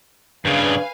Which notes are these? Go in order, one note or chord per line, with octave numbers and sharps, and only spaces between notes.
G2 C#3 D4 B4 F5 G#5